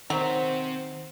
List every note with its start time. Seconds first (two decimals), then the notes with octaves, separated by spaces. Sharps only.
0.10 D#3 F#3 C4 C5 E5